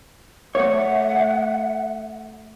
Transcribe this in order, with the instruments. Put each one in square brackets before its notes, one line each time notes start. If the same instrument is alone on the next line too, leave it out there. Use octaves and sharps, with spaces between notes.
[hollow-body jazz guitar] A3 C#5 [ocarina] E5 [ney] F#5